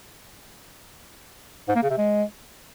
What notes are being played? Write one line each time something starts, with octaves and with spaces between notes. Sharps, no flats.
G#2
A#3
C#3
C3
G#3